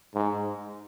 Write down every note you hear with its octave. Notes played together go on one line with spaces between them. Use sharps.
G#2